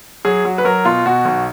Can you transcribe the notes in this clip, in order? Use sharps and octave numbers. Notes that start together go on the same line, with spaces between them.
F#3 G#4
F#3 F#4
B4
F#3 A#4
B2 F4
B2 F#4
B1